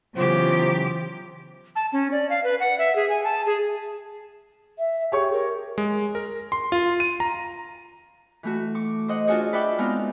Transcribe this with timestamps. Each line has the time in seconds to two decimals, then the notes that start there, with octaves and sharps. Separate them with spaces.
0.16 C#3 E3 F#3 B3 F4 G4 C5
1.76 A5
1.93 C#4
2.12 D5
2.30 F5
2.44 B4
2.60 F#5
2.79 E5
2.96 G#4
3.09 G#5
3.24 A5
3.46 G#4
4.79 E5
5.12 G4 G#4 C#5 C#6
5.33 A#4
5.78 G#3
6.15 A#4
6.52 C6
6.72 F4
7.00 D#7
7.20 A#5
8.43 E3 A3 F#4
8.75 C#6 D6
9.08 C5 D#5 F#5
9.27 D4 F4 F#4 G#4 C#5 D#5
9.53 B4 D5 E5 F#5 G5 D6
9.78 G#3 B3 C4 D#4 F4 A#4